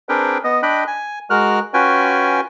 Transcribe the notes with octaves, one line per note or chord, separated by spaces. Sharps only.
C4 D4 G#4 A#4 B4 G5
B3 D#5
D4 D#5 G5 B5 F#6
G#5
G#3 F#4 A#4 F6 F#6
C#4 F4 F#4 B4 G5 G#5